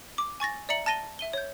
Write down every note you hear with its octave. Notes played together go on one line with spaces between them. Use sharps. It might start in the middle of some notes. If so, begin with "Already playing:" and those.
D6
G#5 C#6 A6 A#6
D5 E5 A#5 C#7 F#7
A5 A6 A#6 D#7 G7
E5 D#7 G7
C#5 G6